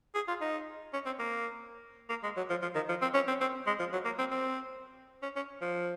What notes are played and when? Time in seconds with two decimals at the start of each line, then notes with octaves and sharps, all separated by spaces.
0.15 G#4
0.28 F4
0.41 D#4
0.93 C#4
1.06 C4
1.19 A#3
2.09 A#3
2.23 G#3
2.37 F#3
2.50 F3
2.62 F3
2.75 D#3
2.89 F3
3.01 C4
3.14 C#4
3.28 C4
3.41 C4
3.67 G#3
3.79 F3
3.93 F#3
4.05 A#3
4.18 C4
4.31 C4
5.22 C#4
5.36 C#4
5.61 F3